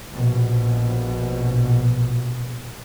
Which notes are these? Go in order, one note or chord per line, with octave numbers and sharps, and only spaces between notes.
A#1 B2